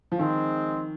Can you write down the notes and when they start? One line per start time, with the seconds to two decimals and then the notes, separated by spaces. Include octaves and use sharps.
0.12 F3
0.18 D#3 G#3 C4